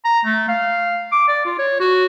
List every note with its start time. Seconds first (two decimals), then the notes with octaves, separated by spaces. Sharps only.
0.05 A#5
0.25 A3
0.48 F5
1.12 D6
1.28 D5
1.46 F4
1.59 C#5
1.80 F#4